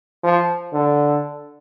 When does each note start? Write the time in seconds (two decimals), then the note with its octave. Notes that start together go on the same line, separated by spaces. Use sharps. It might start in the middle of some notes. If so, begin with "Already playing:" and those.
0.23 F3
0.72 D3